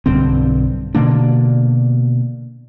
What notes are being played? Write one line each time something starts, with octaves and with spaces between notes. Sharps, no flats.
B1 G2 D3 C4
B2 D3 A#3 D4